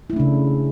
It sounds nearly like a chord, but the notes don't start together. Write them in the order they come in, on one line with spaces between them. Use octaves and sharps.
E4 A3 D4 C#3